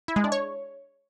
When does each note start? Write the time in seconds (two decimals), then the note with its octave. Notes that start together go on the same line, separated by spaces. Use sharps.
0.08 E4
0.16 G#3
0.24 D4
0.32 C#5